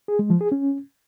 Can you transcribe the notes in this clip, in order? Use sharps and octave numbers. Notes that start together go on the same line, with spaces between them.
G#4
G#3
F3
G#4
C#4